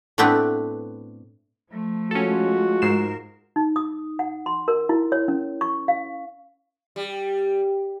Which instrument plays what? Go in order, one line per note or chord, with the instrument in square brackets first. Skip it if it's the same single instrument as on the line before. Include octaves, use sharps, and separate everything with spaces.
[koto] A2 A3 B3 C4 D4 B4
[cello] F3 A3
[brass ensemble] G#3 F4 F#4 [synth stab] C#4 A4
[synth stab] G#2 C7 E7 [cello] A#4
[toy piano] D#4
D#6
F#5
C6
A#4
E4
C#5
C#4
C#6
F5
[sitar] G3